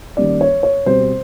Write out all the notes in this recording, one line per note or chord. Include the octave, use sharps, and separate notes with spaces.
D#3 G3 A#3 C#4 D5
C#5
C#5
B2 G3 C4 C5